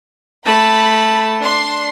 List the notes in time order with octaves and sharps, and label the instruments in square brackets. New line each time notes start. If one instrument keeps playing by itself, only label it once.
[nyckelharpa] A3 A5 [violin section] B5
[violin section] D4 C6